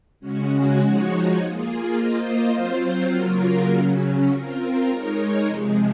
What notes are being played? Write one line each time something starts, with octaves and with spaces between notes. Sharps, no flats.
C#3 G#3 C#4 F#4
F3 G#3 D#4 F#4 C#5
A#3 F4 G#4
A#3 F4 C5 D#5
F#3 C4 F4 C5
C#3 F#3 A#3 F4 A#4
C#3 F#3 C#4
C4 F4 A#4
G#3 D#4 A#4 C#5
C3 F3 G#3